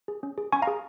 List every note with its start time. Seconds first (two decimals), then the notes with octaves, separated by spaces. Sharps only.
0.08 G#4
0.23 C#4
0.38 G#4
0.52 C#4 G#5 C#6
0.62 F5 A#5
0.67 G#4